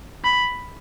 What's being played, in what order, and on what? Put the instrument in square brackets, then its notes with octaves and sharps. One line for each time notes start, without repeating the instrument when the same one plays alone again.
[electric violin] B5